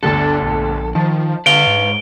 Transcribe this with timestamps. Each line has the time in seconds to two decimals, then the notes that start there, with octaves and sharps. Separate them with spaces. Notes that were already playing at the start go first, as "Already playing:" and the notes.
0.03 G1 D2 D3 D4 A4
0.43 A#1
0.95 D#3 F3 A5
1.46 D3 B4 C#5 F5 D7 G7
1.67 G#2